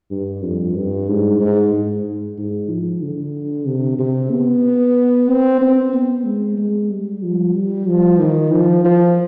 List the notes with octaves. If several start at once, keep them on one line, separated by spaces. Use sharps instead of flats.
G2
F2
G2
G#2
G#2
G#2
G#2
F3
D3
C3
C3
B3
C4
C4
B3
G#3
G#3
G3
F3
G3
F3
D#3
F3
F3